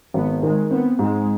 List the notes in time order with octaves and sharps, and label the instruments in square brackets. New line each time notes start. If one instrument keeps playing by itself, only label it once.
[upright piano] G#1 [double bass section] B3
[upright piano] D#3 [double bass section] G#3
[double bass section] B3 [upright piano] C4
[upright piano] G#2 [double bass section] G#3